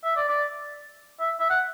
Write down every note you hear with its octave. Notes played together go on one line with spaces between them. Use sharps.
E5
D5
D5
E5
E5
F#5